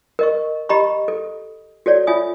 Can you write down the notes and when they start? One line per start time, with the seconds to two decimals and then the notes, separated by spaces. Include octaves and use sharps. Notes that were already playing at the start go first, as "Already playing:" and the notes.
0.19 A#4 D#5 C#6
0.69 G4 D#5 A#5 B5 C#6
1.08 A4
1.86 F#4 A4 C#5 D5
2.07 F4 C#5 E5 G#5 D#6